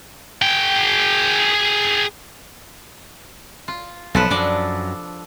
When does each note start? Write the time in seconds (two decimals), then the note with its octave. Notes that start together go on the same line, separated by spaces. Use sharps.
0.42 G#4 G5
3.68 F4
4.15 B1 F3 A4 B4
4.31 F#2 D4 D5